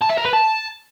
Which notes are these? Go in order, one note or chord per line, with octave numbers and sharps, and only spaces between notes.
A5
E5
A#4
B4
A5